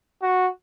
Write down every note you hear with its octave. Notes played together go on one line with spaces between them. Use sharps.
F#4